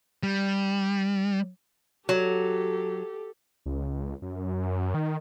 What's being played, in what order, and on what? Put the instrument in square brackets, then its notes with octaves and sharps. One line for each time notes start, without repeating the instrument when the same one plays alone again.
[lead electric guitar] G3
[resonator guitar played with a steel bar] F#3 [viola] G4 A4
[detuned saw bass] C#2
F#2
D#3